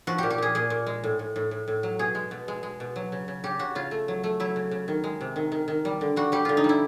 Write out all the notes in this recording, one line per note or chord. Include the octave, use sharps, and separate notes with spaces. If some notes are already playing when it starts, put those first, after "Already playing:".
F3 F#4
A#2 G4
G4
A#2 G#4
A#2 G#4
A#2
G#3
A2
A2
A2
A2
A2
F#3
B2 G#4
G#3
B2
G#3
G#3
B2
F#3
C#3
C#3
C#3 G4
C#3 F#4
C#3 F4
A3
F#3
A3
F#3 E4
C#3
C#3
D#3
G#3
C3
D#3
D#3
D#3
G3
D3
G3 F#4
G3 G4
D3 F4
D#4
G3
E4